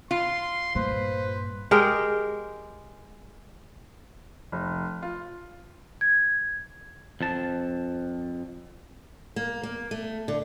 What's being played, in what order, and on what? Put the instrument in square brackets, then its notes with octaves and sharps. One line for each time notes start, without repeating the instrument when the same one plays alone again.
[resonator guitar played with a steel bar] F4 [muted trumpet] C6
[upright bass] G2 A#2 [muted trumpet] B4 [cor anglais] C5
[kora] G#3 G4 A#4
[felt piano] F1
F4
[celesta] G#6
[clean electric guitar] F2 A5
[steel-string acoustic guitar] A#3
A#3
A3
D3